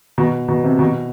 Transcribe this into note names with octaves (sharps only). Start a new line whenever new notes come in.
B2
B2
C3
B2